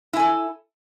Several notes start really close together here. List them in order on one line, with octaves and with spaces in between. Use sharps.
E4 G#5 A4